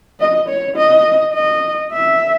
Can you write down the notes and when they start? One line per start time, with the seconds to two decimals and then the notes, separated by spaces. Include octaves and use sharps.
0.20 D#5
0.49 C#5
0.77 D#5
1.34 D#5
1.92 E5